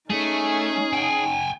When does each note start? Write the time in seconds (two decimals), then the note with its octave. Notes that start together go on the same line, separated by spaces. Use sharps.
0.10 A3 C#4 D#4 G#4
0.93 G5 G#5